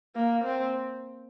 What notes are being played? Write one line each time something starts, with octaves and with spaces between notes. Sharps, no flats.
A#3
C4